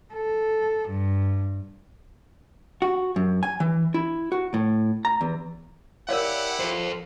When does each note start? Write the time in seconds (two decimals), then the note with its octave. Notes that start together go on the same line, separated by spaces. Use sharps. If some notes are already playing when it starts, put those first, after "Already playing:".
0.16 A4
0.89 G2
2.82 F#4
3.16 F#2
3.43 G#5
3.60 E3
3.94 E4
4.32 F#4
4.54 A2
5.05 A#5
5.21 E2
6.09 E4 G4 A#4 C#5 D5 F5 F#5
6.60 F3 A4 C5